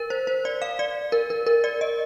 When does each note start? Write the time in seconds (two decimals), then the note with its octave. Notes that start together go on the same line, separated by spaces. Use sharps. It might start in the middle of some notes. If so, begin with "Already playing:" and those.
Already playing: A#4
0.10 C5
0.27 C5
0.45 D5
0.62 F5
0.79 D5
1.12 A#4
1.30 A#4
1.47 A#4
1.64 D5
1.81 D#5